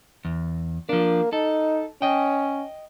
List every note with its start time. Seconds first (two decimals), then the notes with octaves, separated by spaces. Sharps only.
0.25 E2
0.89 F3 A#3 D4
1.33 D#4 A4
2.02 C#4 D#5 G5